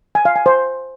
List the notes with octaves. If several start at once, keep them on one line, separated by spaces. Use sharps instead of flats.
G#5
F5
G#5
C5